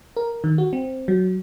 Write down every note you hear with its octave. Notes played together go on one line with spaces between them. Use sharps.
A#4
D#3
F#4
C4
F#3